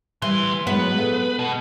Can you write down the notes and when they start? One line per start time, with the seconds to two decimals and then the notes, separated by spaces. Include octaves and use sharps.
0.22 D2 E3 G3 C6
0.67 A2 F#3 G#3 B3 B4
0.98 G#4 A4 F#5
1.39 B2